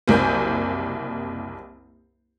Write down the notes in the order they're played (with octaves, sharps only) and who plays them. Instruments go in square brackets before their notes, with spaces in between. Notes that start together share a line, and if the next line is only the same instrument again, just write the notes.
[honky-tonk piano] F#1 C2 A#3 G#5 G6